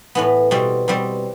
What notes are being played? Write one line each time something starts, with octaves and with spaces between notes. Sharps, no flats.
A2 E3 B3
B2 G3 C4
B2 G3 C4